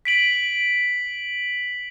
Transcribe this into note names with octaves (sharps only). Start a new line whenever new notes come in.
B6 D7 F#7